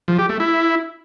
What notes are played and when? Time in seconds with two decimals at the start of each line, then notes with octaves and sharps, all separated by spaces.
0.08 F3
0.19 G4
0.29 A3
0.40 E4